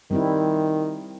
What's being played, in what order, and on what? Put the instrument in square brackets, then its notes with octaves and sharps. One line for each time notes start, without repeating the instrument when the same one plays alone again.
[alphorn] D#3 [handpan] G3 C4 E4